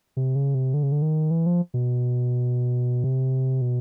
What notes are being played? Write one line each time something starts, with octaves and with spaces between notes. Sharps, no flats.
C3
C#3
C3
D3
C#3
D3
D#3
E3
F3
B2
C3
B2